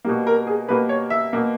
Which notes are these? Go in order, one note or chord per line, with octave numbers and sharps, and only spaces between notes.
B2 G3 A#3
A#4
G#4
B2 G3 A#3 B4
C#5
E5
B2 A#3